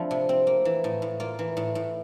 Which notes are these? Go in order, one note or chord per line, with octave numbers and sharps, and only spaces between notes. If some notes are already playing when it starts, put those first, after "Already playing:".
Already playing: F3 A3 C4 D4 E4
C3
C4
A#3
E3
A2
A2
A#3 F4
E3
A2
A2